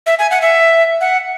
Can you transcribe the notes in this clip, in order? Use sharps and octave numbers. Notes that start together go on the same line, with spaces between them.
E5
G#5
F#5
E5
F#5